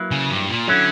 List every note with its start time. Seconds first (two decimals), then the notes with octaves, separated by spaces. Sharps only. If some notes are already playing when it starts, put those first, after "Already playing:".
Already playing: F#3 A#3 E4 B4
0.11 C#3
0.31 G2
0.49 A#2
0.68 D3 F#3 C#4 E4